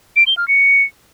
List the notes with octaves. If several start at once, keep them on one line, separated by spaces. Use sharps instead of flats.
D7
G7
F6
C#7